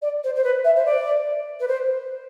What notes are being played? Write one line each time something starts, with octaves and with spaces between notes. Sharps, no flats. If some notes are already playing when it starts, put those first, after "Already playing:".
D5
C5
C5
B4
E5
C5
D5
B4
C5